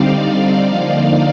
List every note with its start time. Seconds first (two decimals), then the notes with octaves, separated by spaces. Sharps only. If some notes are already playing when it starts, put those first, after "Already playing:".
Already playing: D3 G3 C4 D#4 D5 F5
0.14 D5 F5
0.69 D3 F3 A#3 D#4